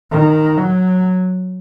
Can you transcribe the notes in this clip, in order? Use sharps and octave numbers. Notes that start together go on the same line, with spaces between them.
D#3
F#3